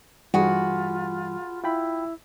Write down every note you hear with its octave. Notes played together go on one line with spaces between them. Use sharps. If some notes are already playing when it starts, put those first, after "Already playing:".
G2 E3 G3 F4 F#4 G#4 B4
E4 F4 G5 B5